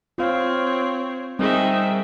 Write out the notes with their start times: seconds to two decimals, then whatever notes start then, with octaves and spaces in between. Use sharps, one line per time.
0.18 C4 F4 C#5 F5
1.39 G3 C4 D#4 G#4 A#4 E5 G5